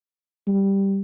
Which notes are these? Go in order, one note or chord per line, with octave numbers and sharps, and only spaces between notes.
G3